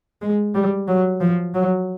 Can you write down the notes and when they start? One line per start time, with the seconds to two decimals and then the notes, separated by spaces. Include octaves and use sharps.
0.22 G#3
0.54 G3
0.88 F#3
1.21 F3
1.55 F#3